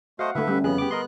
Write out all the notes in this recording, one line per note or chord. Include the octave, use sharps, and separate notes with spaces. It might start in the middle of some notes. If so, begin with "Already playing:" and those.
A3 F#4 C5 D#5 F5 F#5
D3 A3 B4 E5
G3 C#4
F2 C#3 B3 G#4 F#6
G4 D6
A#4 D#5 C6